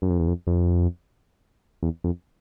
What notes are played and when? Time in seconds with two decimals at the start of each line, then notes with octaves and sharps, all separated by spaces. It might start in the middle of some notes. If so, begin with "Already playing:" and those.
0.02 F#2
0.10 F2
0.20 E2
0.28 F2
0.47 F2
1.83 E2
2.04 F2